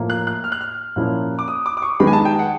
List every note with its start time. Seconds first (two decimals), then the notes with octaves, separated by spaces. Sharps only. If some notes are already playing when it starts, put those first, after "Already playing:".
Already playing: A2 F3 A#3
0.10 F#6
0.27 F#6
0.44 F6
0.52 F#6
0.61 F6
0.96 A#2 F3 A#3 C#4 E4
1.39 D6
1.48 D#6
1.66 D6
1.77 D6
1.82 C#6
2.00 D#3 G#3 B3 D#4 B5
2.07 G#5
2.13 A5
2.25 G5
2.39 F#5